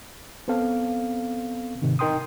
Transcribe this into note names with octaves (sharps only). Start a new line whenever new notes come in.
B3 C4 A4 F5
G#2 C3 D#3
D#4 A#4 G5 C6 D#6